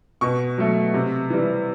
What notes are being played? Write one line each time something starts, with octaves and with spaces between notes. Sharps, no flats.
B2 C#6
F#3 A3
C3
E3 G3